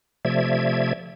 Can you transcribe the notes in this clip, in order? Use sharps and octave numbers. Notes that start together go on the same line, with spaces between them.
C3 F3 A3 D5 E5 G#6